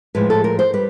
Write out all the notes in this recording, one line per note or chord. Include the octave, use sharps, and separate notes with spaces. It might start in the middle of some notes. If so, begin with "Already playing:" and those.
A2 F3 G#3 B4
A4
A#4
C5
G3 B4